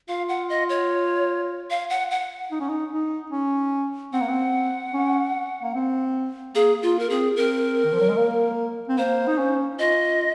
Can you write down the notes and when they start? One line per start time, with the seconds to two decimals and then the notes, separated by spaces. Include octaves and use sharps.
0.08 F4 F5
0.29 F#5
0.50 D#5
0.69 C#5
1.70 F5
1.90 F#5
2.11 F#5
2.51 D#4
2.60 C#4
2.69 D#4
2.92 D#4
3.31 C#4
4.13 C4 F#5
4.20 A#3
4.28 C4
4.93 C#4
5.63 A#3
5.74 C4
6.55 A#3 G#4
6.82 A#3 F4
6.99 A#4
7.09 C4 G#4
7.36 C4 A#4
7.84 D#3
7.93 F3
8.01 F#3
8.09 G#3
8.17 A#3
8.89 C4
8.98 A#3 C5
9.27 D#4
9.38 C#4
9.79 F4 D#5